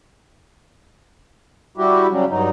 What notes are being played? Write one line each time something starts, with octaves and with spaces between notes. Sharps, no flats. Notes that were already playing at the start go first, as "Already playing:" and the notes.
G3 E4 F#4 G4
C#3 F#3 G3
G2 F#3 D#4